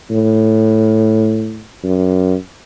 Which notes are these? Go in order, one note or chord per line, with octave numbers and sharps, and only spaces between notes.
A2
F#2